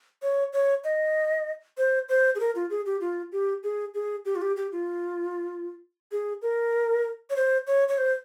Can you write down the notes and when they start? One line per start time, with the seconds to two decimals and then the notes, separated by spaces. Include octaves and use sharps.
0.22 C#5
0.53 C#5
0.84 D#5
1.77 C5
2.09 C5
2.35 G#4
2.40 A#4
2.55 F4
2.70 G#4
2.86 G4
3.01 F4
3.32 G4
3.63 G#4
3.94 G#4
4.25 G4
4.36 F4
4.42 G4
4.56 G4
4.72 F4
6.12 G#4
6.42 A#4
7.30 C#5
7.36 C5
7.67 C#5
7.89 C#5
7.98 C5